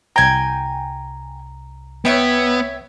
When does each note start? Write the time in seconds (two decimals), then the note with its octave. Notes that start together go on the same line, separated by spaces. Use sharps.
0.16 C2 G5 G#5 A#5
2.05 B3 C#5 E5 G5